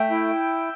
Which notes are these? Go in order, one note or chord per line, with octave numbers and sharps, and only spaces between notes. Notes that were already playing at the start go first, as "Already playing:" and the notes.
Already playing: A3 E5 G5
E4